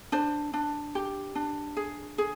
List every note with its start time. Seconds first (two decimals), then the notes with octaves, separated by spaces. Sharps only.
0.12 D4 C5
0.54 D4
0.95 G4
1.35 D4
1.77 G#4
2.18 G#4